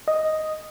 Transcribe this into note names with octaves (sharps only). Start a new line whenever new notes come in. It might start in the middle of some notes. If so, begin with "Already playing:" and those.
D#5